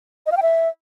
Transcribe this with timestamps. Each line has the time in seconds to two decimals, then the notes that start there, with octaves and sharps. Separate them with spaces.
0.26 D#5
0.32 F5
0.37 G5
0.42 E5